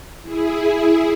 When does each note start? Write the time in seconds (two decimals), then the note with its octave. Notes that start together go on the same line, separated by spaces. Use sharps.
0.22 E4 G#4